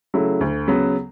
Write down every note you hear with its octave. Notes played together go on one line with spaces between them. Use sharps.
C#3 F#3 A3 E4
D2
C#3 F#3 B3